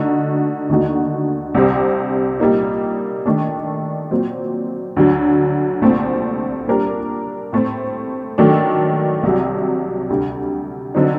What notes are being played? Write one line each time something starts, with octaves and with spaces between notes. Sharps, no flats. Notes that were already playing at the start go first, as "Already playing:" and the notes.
Already playing: D3 A3 D#4 F#4
D#2 D3 A3 D#4 F#4
C2 C3 G3 C4 G4
A#2 G3 A#3 D#4
D#3 A3 D4
A#2 F#3 C4
D2 D3 F#3
C2 A#2 A3 C4
A#2 G3 D4 G4 A#4
A2 A3 C4
D#3 F#3 A3 D4 A4
C2 C3 F#3
D2 C3 G3
D3 F#3 C4 D#4